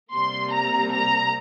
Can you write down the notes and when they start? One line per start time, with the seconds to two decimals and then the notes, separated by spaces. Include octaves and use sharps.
0.12 C3 G3 A#3 C6
0.52 A#5
0.92 A#5